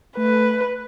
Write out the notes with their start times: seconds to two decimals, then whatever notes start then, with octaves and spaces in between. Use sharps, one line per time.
0.17 A3 B4